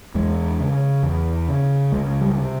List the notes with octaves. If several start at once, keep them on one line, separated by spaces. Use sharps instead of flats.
E2 G#3
C#3
E2
C#3
C#2 G#3
G3
C3